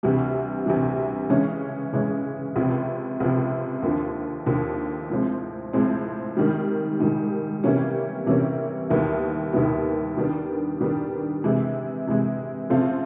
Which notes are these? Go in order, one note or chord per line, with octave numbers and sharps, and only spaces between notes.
D2 C3 E3 G3
D2 C3 E3 G3
C#3 E3 G#3 C#4
C#3 E3 G#3 C#4
C#2 C3 F3
C#2 C3 F3
D#2 D3 F3
D#2 D3 F3
A2 F3 G#3 C4
A2 F3 G#3 C4
G#2 D#3 G3
G#2 D#3 G3
C3 E3 G3 A#3 C#4
C3 E3 G3 A#3 C#4
D#2 D#3 G3 B3 E4
D#2 D#3 G3 B3 E4
D#3 G3 B3 D4
D#3 G3 B3 D4
C3 E3 G#3
C3 E3 G#3
C#3 F3 A3 C4 F4